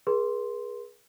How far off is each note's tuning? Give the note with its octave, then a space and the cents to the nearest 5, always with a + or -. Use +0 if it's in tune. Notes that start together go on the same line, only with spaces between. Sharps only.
G#4 +0 B4 -45 C6 +0